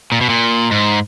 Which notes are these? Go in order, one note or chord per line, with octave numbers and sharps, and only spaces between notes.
A#2
B2
A#2
G#2